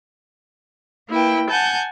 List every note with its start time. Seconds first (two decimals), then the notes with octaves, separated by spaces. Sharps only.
1.09 A#3 E4 B4 G5
1.50 F#5 G#5 A5 G6